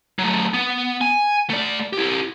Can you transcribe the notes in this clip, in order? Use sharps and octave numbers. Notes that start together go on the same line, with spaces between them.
F#3 A3
B3
G#5
A3 D5
E4 G4